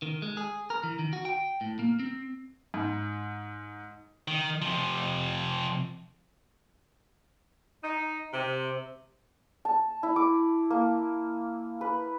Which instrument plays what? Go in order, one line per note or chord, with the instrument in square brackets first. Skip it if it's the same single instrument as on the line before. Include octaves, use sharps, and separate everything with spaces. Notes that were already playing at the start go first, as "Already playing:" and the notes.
[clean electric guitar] D#3
G#3
G#4
A#4
E3
D#3
F#4
G5
A2
A#3
C4
[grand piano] G#2
[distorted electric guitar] D#3
C3 F3
[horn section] D#4
C3
[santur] A5
E4
D6
A#3
B4